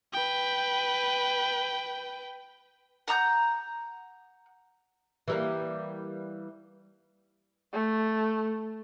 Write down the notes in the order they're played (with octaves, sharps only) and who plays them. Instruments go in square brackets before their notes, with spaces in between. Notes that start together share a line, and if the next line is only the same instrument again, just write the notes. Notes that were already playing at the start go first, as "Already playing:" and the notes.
[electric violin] B4 G5
[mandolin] F#5 A#5 D#6 G6
[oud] E3 G3 A#3
[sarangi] A3